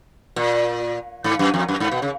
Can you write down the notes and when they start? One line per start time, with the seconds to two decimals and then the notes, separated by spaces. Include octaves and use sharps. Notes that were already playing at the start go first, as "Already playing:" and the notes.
0.36 A#2
1.24 G#2
1.39 F#2
1.54 F2
1.68 F#2
1.80 G#2
1.92 B2
2.02 C#3